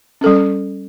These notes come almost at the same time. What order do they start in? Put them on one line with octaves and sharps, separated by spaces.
C#4 A4 G3